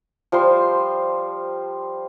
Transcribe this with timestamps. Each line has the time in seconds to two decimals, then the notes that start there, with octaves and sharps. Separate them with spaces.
0.32 F3 G3 C5 C6